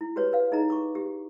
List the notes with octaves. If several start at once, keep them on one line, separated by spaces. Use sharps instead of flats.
E4
F#4 G4 B4 C#5
B4 F5
D#4 G#4 D#5 A#5
C#6 D6
G4